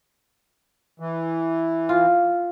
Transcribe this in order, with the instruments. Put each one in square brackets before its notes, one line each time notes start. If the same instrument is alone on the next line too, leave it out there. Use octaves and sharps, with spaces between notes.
[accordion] E3
[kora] F4